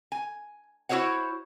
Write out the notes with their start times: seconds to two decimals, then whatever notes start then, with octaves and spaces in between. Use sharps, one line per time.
0.12 G#5
0.89 E4 F#4 G#4 C5 C#5 F#5